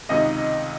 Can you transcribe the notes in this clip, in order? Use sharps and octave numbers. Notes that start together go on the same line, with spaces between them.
C#2 C3 D#3 D#5